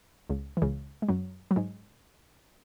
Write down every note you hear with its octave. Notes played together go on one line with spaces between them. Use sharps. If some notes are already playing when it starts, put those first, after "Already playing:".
C#2 C#3
E3
C#2 C#3
G#3
F#2 F#3
F#3
G#2 G#3